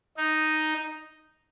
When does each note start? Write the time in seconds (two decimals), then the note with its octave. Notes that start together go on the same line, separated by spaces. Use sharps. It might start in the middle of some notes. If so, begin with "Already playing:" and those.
0.17 D#4